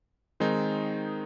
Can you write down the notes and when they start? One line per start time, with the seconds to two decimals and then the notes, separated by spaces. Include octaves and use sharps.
0.40 D#3 G#3 C4 D#4